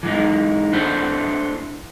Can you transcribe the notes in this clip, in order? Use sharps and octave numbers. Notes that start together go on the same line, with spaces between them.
E3 G#3 D#4
A3 D4 E4 C5